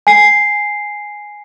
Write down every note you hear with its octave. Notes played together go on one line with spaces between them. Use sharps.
G#5 C7